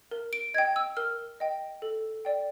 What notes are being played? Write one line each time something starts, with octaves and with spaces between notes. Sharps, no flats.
A#4
D7
D#5 G5 G#6
E6
A#4 F6
D#5 G5
A4
D5 G5